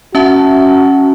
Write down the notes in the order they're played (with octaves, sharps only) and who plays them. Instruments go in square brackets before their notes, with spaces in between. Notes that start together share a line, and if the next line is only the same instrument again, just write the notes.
[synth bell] C#4 E5 A5 [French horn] F#4